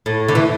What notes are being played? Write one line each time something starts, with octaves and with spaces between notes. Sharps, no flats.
A2
D3
E3